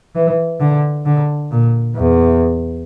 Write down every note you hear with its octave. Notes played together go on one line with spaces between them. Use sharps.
E3
D3
D3
A#2
E2